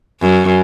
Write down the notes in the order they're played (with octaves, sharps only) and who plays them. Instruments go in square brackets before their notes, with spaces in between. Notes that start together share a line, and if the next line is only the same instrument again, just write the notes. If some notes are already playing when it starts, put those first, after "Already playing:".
[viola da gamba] F#2